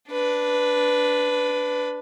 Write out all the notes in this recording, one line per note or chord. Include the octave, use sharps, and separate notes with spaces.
D4 B4